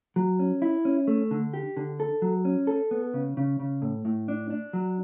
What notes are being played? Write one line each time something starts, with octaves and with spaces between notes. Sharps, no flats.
F#3
C#4
E4
C#4
A3
D3
G4
D3
A4
F#3
C#4
A4
B3
C#3
C#3
C#3
A2
A2
D4
D4
F#3